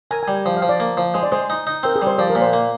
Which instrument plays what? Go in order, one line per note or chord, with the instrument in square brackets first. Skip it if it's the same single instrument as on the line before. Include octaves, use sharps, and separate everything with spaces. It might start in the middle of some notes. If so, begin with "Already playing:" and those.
[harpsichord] A#4 [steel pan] G#5
[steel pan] G#5
[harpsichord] G3
[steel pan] G#5
[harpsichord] F3 [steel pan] G5
[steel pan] F5
[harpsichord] F3
[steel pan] D5
[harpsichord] A#3
F3
[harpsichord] G#3 [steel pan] C5
[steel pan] D5
[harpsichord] G#3 [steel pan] C5
[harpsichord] D#4
D#4
[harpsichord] C4 [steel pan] A#4
[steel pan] G#4
[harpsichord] G3
[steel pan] C5
[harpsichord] F3 [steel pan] D5
[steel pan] A#4
[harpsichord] A#2
[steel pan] C5
[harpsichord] A#3